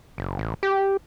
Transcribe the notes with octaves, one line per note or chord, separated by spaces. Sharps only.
F#1
A1
G4